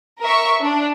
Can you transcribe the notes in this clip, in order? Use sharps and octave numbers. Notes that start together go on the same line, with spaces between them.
A#4 E5 C#6
D4